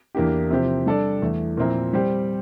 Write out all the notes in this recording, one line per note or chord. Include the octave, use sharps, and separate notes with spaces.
E2 E3 A#3 D4 G4
C3 F3 C4 G4
G3 D4 A4 D5
E2 E3 A3
A#2 F3 C4 E4 A#4
G3 C4 G4 C5